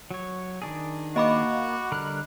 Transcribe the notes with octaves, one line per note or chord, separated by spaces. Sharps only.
F#3 C#5
D#3 D4 G#4
A#3 F#4 D#5 B5 D6
D3 G3 A#4 F#6